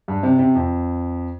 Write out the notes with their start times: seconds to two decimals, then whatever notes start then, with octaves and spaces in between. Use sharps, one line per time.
0.08 G2
0.23 C3
0.39 C3
0.55 F2